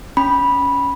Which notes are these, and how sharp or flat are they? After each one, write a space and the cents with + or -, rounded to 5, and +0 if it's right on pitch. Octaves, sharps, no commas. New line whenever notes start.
C#4 +10 B5 -10